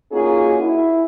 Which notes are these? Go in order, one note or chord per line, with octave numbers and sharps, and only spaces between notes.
A#3 C#4 D#4 F4 F#4 G#4
E4